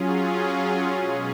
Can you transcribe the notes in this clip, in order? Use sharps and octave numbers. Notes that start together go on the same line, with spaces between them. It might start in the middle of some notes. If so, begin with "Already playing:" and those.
Already playing: F#3 C#4 F4 G#4
B2 G#3 C#4 G#4